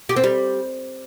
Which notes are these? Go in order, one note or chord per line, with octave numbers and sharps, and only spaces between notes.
G4
C4
G3